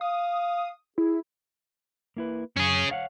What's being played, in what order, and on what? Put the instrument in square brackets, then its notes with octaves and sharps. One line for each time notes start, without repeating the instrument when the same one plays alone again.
[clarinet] F5 [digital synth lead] D#6
[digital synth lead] E4 [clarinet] G#4
[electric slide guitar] A#3 E4 B4
[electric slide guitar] F#2 [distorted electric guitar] C#4 G#4
[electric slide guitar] C#5 F5 F#5